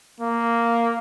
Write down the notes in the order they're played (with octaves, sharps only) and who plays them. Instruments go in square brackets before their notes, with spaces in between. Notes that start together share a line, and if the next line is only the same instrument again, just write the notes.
[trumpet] A#3